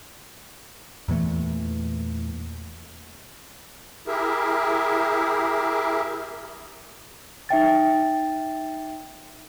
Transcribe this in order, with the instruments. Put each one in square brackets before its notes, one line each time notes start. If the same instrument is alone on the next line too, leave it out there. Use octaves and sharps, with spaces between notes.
[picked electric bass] E2 A#2 E3 A3
[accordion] E4 G4 G#4 A#4 E5
[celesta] D#4 E5 G5 A6